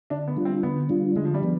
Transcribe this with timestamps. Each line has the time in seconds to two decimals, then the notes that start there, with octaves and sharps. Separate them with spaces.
0.10 D3 D4
0.28 B3
0.37 G3 D4 F4
0.45 C4
0.63 D3 B3
0.89 G3 D4 F4
1.16 D3 G#3
1.25 F3
1.34 G3
1.43 F3 B3